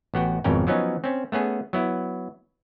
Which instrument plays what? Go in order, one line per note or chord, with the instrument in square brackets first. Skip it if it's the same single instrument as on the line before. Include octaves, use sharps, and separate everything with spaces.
[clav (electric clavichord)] A1 B3 F#4 G5
G#1 F2 B2 C#4 A#4 G5
F3 F#3 B3 C#4 D#4
C4 C#4
A3 B3 C#4 G#4
F#3 B3 E4